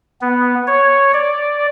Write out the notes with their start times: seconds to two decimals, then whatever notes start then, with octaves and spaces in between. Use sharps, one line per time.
0.21 B3
0.67 C#5
1.14 D5